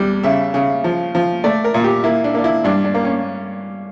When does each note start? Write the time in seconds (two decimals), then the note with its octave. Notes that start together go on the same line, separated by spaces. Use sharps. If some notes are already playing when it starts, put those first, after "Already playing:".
Already playing: E2 G3
0.23 C#3 E5
0.54 C#3
0.84 F3
1.15 F3
1.44 A3 D5
1.64 A#4
1.74 A#2
1.84 G4
2.04 A#3 E4
2.24 D4
2.34 A#3 D4
2.44 E4
2.64 G2 D4
2.84 D4
2.94 A#3
3.05 C#4